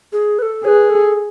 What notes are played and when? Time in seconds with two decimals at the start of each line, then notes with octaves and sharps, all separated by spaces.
0.13 G#4
0.39 B4
0.42 A4
0.64 G#4 C#5
0.68 B4
0.90 A4